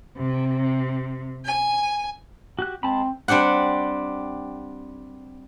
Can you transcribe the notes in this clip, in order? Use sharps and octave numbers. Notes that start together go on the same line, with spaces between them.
C3
G#5
F#4 G4 F#6
G#3 C4 A5 B5
G3 C4 D4 G4 F#5